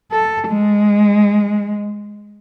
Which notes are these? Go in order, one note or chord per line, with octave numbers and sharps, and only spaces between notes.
A4
G#3